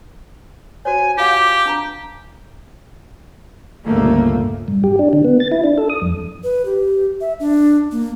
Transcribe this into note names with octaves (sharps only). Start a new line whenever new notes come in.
F#4 C5 C#5 G#5
F4 G4 F5 F#5 D6
D4 A5 A#5
G1 C#2 A#2 A3 A#3
G2
G4
D4
D3
B3
A6
E4
D4
A4
D#6
F2
B4
G4
E5
D4
A#3